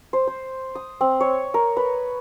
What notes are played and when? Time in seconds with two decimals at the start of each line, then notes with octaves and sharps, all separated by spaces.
0.13 C5
0.27 C5
0.75 D#6
1.01 C4
1.21 C#5
1.54 A#4
1.77 B4